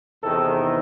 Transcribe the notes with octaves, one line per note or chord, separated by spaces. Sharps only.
E2 C3 D#3 A4